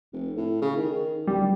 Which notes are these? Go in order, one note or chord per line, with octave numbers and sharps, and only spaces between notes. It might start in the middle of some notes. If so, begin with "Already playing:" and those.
F1
A2
C#3
D#3
D1 G3